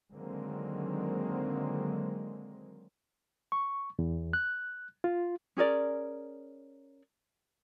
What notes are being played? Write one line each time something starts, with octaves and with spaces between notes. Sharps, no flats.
D3 D#3 F#3 G#3 A#3 C4
C#6
E2
F#6
F4
C#4 G#4 A#4 D5